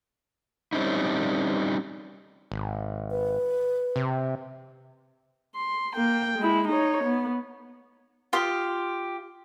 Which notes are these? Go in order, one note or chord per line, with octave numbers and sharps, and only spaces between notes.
G3 C4 C#4 D#4 E4
G#1
B4
C3
C6
A#3 G5
G#3 E4
D#4 C#5
B3
F4 G4 C6 D#6